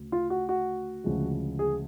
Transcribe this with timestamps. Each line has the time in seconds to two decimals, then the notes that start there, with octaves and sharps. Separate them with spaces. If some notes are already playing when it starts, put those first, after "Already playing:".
Already playing: D2 C#3
0.12 F4
0.30 F#4
0.49 F#4
1.04 D2 C#3 F3 G#3
1.59 G#4